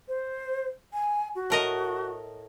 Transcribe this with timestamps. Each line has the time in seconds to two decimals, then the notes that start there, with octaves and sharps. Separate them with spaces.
0.08 C5
0.93 G#5
1.35 F#4
1.50 A2 A#4 D#5